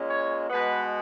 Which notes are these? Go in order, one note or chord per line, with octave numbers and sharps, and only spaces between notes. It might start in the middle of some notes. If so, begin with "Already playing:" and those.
Already playing: A#2 G#3 C#4
C#5
B2 G#3 B3 B4